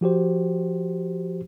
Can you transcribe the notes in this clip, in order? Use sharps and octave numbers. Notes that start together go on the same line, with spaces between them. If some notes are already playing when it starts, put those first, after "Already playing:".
F3 F#4 G4 C5